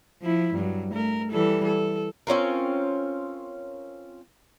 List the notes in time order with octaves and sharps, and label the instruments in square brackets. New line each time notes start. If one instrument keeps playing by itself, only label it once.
[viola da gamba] F3 E4
G2 F#3
A3 A#4
E3 G3 A4
A4
[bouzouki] C4 C#4 F4 A#4